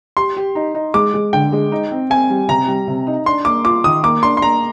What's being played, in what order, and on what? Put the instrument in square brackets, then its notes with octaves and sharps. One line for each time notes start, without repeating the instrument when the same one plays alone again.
[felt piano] G4 [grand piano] C6
[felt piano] G4
D#4
D#4
[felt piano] G#3 [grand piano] D6
[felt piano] G#3
[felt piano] D3 [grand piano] G5
[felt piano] G#3
D#4
C4
[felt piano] C4 [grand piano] G#5
[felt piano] G3
[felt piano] C3 [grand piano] A#5
[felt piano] G3
C3
D#4
[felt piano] D4 [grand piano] C6
[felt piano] A#3 [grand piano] D6
[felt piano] F4 [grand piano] D6
[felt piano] D#3 [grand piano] D#6
[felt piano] A#3 [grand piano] D6
[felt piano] D4 [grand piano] C6
[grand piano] C6
[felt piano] A#3 [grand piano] A#5